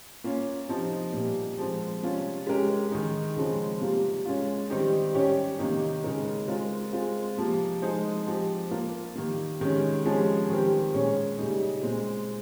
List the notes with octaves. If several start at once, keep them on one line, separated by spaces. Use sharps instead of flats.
A#3 C#4 F4
C3 F3 C4 D#4
A#2 G3 A#3
F3 G#3 C4
C3 G3 C#4 F4
G#3 C#4 G4 A#4
D#3 G#3 D#4
C#3 F3 G#3 C4
C3 G3 A#3 F4
G#3 C#4 F4
D#3 G3 C4 D#4 G4
G3 C#4 G4 C#5
C3 D#3 A#3 D#4
C#3 G#3 D#4 A#4
G#3 C4 F4 A#4
G#3 C4 F4
C3 F3 A#3
F3 G#3 D#4 G#4 C5
F3 C4 G4
A#3 F4 A#4
D#3 G3 A#3
C3 D#3 G#3 C#4
C3 F3 G#3 C#4 G#4
D#3 G3 C4 G4 A#4
A#2 G#3 C#4 G#4 C#5
C#3 G3 A#3 D#4
A#2 G#3 C4